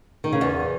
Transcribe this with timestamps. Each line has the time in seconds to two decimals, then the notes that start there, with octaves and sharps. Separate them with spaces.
0.24 D#3
0.33 C#3
0.41 E2